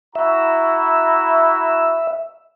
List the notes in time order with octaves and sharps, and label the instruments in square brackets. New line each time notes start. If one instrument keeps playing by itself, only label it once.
[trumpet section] E4 F#4 A#5 [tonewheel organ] E5